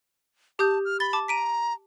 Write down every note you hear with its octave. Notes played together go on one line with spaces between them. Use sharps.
G4 A5 D#6 G6
F6
B5 A6 G7
A5 D6
A#5 B6 D7 D#7